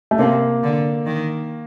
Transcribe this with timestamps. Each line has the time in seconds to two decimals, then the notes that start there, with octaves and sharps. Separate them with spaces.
0.11 A3
0.19 C3 A#3
0.63 D3
1.06 D#3